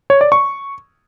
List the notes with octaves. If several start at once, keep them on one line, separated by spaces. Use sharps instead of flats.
C#5
D5
C#6